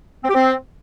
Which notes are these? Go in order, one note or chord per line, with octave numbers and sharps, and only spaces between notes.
C4
G4
C4